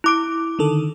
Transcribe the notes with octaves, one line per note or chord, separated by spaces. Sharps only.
E4 D6 D7
D3 D#3 A4